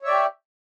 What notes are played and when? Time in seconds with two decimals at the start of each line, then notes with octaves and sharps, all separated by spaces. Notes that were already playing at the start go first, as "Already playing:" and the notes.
0.02 C#5
0.05 E5
0.07 D5
0.10 G4